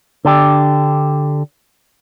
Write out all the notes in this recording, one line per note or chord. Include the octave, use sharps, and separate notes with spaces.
D3 D4 G4